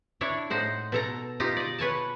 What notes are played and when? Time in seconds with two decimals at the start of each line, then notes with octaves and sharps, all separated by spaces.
0.21 D4 E4 C#5
0.50 A2 D#4 C5 F#5
0.92 B2 A4 A#5
1.40 D#4 F4 G4
1.57 D5 D#5
1.79 B4 C#5 G#5 A5